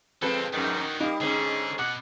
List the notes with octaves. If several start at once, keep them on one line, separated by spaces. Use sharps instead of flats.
D3 F3 G#3 C4 A4 B4 F5
F2 G#2 D#3 D4 F#4
G3 A#3 D#4
G#2 D3 B3 C#4 G#4
B2 F#5 D6